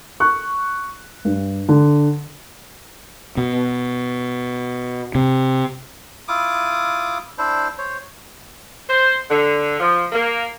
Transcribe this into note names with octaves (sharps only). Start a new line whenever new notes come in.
C#6 F#6
G2
D3
B2
C3
E4 F4 D6 D#6
D4 E4 C5
C5 C#5
C5
D3
F3
A#3